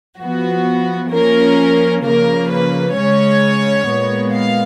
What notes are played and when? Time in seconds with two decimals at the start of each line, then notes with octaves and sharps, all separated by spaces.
0.19 F3 B3 F#4
1.11 F3 A#3 C#4 A#4
2.04 C#3 F3 A#3 A#4
2.50 B4
2.95 C#3 G#3 C#4 C#5
3.87 A#2 G#3 B3
4.33 F5